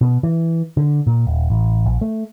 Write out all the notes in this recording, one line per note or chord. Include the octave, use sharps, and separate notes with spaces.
B2
E3
D3
A#2
D#1
A1
A#1
A3